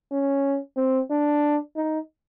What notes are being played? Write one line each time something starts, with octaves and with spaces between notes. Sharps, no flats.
C#4
C4
D4
D#4